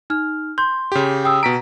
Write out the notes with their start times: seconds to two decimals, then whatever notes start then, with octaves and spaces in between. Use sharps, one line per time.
0.10 D#4 F6
0.58 C6 G6
0.92 C#3 G4
1.24 G5 D#6 E6
1.43 B2 A#5 B6 D7